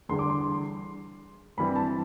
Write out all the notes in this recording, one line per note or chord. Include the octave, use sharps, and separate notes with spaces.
E2 D3 G3 C6
D6
C6
G2 E3 G3 C4 B5
A5